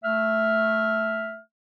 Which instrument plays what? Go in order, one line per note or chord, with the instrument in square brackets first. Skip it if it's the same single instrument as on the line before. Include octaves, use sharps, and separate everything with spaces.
[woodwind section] A3 E5 F6